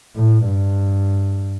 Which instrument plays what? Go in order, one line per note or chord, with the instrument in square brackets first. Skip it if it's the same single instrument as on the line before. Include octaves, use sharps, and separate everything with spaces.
[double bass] A2
G2